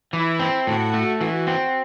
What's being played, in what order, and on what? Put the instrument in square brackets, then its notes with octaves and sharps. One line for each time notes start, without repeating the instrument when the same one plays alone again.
[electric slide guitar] E3 [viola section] E4
[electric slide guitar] C4
[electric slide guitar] A2 [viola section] F#4
[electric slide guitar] A3
[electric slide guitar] E3 [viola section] F#4
[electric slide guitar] C4